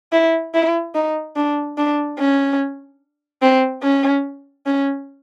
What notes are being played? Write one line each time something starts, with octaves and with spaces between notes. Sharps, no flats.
E4
E4
D#4
D4
D4
C#4
C4
C#4
C#4